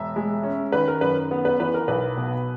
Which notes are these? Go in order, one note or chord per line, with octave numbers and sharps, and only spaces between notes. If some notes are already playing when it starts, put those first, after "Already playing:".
Already playing: E1 E5
G#3
C#4
D#3 B4
A#4
F#2 B4
B3
B4
E3 B4
A#4
B1 B4
B2